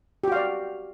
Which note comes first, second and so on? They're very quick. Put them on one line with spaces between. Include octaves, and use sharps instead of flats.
G4 F#4 F5 D5